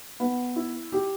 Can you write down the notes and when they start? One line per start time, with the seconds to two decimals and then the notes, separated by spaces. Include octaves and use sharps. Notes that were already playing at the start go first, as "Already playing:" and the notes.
0.20 B3
0.56 E4
0.92 G4